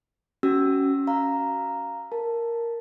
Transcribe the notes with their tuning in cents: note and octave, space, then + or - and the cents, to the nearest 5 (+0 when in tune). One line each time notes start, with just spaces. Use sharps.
C#4 +0 F#4 +25 E6 +0
F5 +0 A#5 +0
A#4 +0 A5 +0